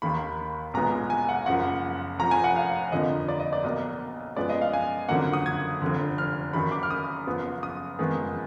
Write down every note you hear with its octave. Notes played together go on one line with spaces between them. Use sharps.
D#2 D#3 A#3 B5
B1 A#2 G#3 B3 A#5
G#5
F#5
F#1 F#2 F3 A#3 F#5
F1 F2 F3 A#5
G#5
F#5
F5
F1 F2 D3 F3 A#3 D#5
D5
D#5
D5
B1 B2 A#3 D#5
F#2 F3 G#3 B3 D5
D#5
F5
G#5
F#1 F2 D3 F#3 A#3 F#5
D#6
G#6
F1 F2 D3
F6
F#1 F#2 D#3 F#3 B5
D6
F6
D#6
F#1 F#2 F3 B3
D#6
F#1 F2 D#3 G#3 B3